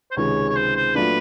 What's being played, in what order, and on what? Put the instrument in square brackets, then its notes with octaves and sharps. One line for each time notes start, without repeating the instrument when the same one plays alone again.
[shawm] C5
[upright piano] C#2 C3 D#3 G#3 C#4 [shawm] C#5
[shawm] C#5
C5
C5
[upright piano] A#2 F#3 A3 D4 F4 [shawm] B4